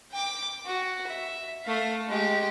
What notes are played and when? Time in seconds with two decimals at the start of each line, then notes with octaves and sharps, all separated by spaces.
0.12 G5 D6
0.66 F#4
1.07 E5
1.66 A3 F5
2.08 G#3 G4